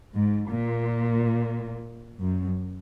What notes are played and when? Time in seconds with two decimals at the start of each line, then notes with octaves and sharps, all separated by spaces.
0.16 G#2
0.50 A#2
2.21 F#2